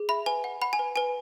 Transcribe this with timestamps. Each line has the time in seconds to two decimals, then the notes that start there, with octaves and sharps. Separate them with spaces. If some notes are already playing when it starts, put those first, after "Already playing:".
Already playing: G#4
0.09 E5 B5
0.26 B4 G#5
0.44 F#5
0.62 F#5 B5
0.73 G#5
0.79 B4
0.96 B4 G#5